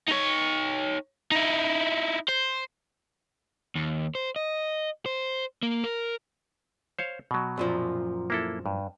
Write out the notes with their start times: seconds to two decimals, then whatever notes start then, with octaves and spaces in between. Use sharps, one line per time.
0.09 D#4 C#5
1.32 D#4 E4
2.29 C5
3.75 D#2
4.15 C5
4.36 D#5
5.06 C5
5.63 A#3
5.84 A#4
6.99 C5 C#5 F5
7.31 B2 F#3
7.58 F#2 A#2 F3
8.30 A#3 E4 A4
8.66 G2